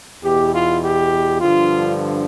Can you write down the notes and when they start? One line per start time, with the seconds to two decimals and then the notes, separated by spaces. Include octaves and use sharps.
0.24 E2 B2 G4
0.53 F4
0.83 G4
1.41 G2 D3 F3 F4